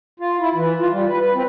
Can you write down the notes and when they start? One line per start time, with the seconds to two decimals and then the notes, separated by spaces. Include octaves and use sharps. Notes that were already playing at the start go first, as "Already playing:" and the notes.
0.20 F4
0.40 E4
0.55 E3
0.79 F4
0.91 G3
1.07 B4
1.21 B4
1.35 C4